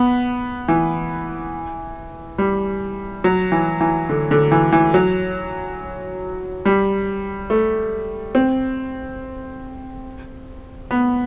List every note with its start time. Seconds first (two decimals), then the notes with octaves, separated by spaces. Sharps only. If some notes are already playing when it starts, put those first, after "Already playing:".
Already playing: B3
0.68 E3
2.38 G3
3.24 F#3
3.52 E3
3.81 E3
4.09 D3
4.31 D3
4.52 E3
4.72 E3
4.94 F#3
6.65 G3
7.50 A3
8.35 C4
10.91 B3